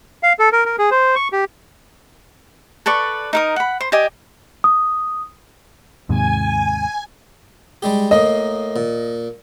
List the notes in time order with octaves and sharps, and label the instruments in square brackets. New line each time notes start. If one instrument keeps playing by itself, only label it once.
[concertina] F5
A4
A#4
A#4
G#4
C5
C#6
G4
[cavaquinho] A4 B4 D5 C#6
D#4 A#4 D#6
F#5 B5
C5
G4 D5 D#5 G#5
[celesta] D#6
[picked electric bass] D#2 G#2 C3 [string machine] G#5
[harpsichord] G3 G#3 G4
[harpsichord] A2 A#3 C6 [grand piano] D#5
[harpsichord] A#2